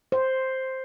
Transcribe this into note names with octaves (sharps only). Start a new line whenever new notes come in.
C5